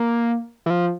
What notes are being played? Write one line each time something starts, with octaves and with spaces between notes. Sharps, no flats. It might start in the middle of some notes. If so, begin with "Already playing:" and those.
Already playing: A#3
E3
F3